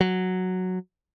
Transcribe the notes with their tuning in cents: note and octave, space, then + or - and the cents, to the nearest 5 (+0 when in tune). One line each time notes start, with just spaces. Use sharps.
F#3 -5